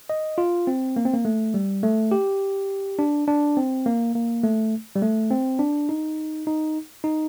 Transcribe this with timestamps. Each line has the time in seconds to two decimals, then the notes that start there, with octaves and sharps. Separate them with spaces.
0.10 D#5
0.38 F4
0.67 C4
0.96 A#3
1.05 C4
1.13 A#3
1.25 A3
1.54 G3
1.83 A3
2.11 G4
2.99 D4
3.28 D4
3.57 C4
3.86 A#3
4.15 A#3
4.43 A3
4.96 G3
5.02 A3
5.31 C4
5.59 D4
5.89 D#4
6.47 D#4
7.04 D#4